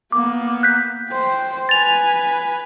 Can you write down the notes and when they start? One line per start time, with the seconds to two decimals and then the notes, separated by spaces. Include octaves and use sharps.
0.12 A#3 B3 D6
0.63 F#6 G6 B6
1.09 C5 G5
1.69 B4 G#5 A6 F7